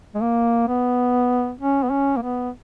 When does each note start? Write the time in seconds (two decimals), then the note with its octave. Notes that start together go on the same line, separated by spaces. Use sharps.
0.15 G#3
0.22 A#3
0.68 B3
1.60 C#4
1.83 B3
1.90 C#4
2.17 A#3
2.22 B3